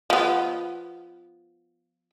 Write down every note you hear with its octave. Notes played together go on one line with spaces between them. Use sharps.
F3 B3